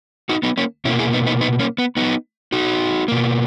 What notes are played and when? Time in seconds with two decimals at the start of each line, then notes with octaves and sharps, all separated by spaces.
0.29 D#4 F#4
0.43 B3 D#4
0.57 A#3 C#4
0.85 B2 C#4 E4
0.89 A#3
0.99 E4 G#4
1.13 B3 D#4
1.26 B3 D#4
1.41 B3 D#4
1.59 A#3 C#4
1.78 B3
1.97 B3 D#4
2.52 D#4 F#4
3.08 B2 A#3